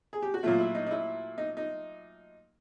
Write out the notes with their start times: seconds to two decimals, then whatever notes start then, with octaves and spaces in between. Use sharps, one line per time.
0.13 G#4
0.22 G4
0.34 F#4
0.43 A#2 F#3 A3 F4
0.60 E4
0.75 D#4
0.86 D#4
0.91 E4
1.38 D#4
1.57 D#4